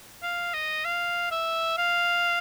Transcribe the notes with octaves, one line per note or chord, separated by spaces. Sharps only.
F5
D#5
F5
E5
F5